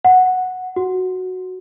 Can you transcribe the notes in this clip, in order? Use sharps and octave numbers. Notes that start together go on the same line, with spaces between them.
F#5
F#4